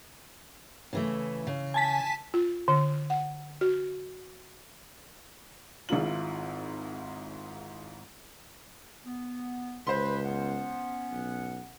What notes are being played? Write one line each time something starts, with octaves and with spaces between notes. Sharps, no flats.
C#3 E3 A3
C#3
G#5 A5 B6
F4
D3
F#5
F#4
G#1 G#2 E4 F4 F#7
B3
C#2 B4 C5 B5 C6
B3 C#4 F#5
B1